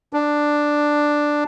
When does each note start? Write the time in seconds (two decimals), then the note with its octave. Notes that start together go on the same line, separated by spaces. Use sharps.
0.13 D4